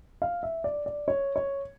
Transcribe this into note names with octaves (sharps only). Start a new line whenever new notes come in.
F5
E5
D5
D5
C#5
C#5